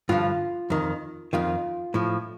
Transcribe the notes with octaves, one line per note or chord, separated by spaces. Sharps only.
G2 D3 F3 F4
F2 D#3
F2 D#3 F4
A2 F3